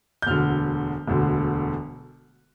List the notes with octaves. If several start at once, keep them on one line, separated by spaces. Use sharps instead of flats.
G6
E1 D2 D3 F6
E1 D2 D3